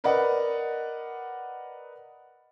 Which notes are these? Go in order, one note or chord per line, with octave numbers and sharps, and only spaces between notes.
A#4 B4 D5 D#5 F#5